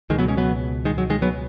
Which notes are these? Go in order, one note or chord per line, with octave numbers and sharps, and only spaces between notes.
C#2 B2 D#3 G#3
F#3 B3
G#3 C#4
F#3 B3
D#3 G#3
F#3
D#3 G#3
F#3 B3